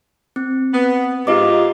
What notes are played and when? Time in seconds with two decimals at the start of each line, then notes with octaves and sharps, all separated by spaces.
0.36 C4
0.73 B3
1.27 G#2 F4 G4 D#5 D6